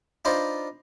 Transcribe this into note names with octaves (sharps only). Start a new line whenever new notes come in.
D4 D#4 F4 B4 C5 D#5